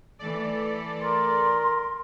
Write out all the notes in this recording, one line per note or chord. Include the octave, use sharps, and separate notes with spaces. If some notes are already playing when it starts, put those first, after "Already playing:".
E3 A3 A4 D5
A#4 C6